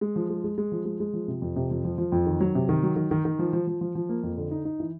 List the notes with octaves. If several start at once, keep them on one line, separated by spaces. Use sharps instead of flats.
G#3
F3
G#3
G#3
G#3
F3
G#3
G#3
F3
C3
F2
C3
F2
F3
F3
F2
D#3
F#3
C3
D#3
F#3
D#3
D#3
D#3
F3
F3
F3
F3
F3
A#3
F2
D3
D#4
D#4
E3